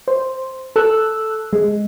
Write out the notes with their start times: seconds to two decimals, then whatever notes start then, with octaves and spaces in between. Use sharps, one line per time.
0.08 C5
0.76 A4 E6 F#6
1.53 G#3